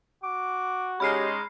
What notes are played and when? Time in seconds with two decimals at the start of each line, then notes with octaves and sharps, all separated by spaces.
0.24 F#4 D6
1.00 G#3 C#4 D#4 G4 B5 F6 C7